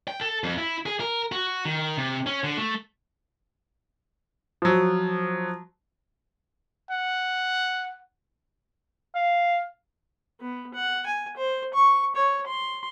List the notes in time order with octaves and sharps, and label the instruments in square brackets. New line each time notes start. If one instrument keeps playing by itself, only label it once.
[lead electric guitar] G5
A4
F2
E4
G#4
A#4
F#4
D#3
C3
C#4
D3
A3
[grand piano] F3 F#3
[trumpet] F#5
[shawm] F5
[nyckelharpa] B3
F#5
G#5
C5
C#6
C#5
C6